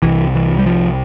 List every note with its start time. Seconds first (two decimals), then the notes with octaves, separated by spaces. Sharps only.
0.02 C2 C3 E3
0.35 E3
0.59 G3
0.66 F3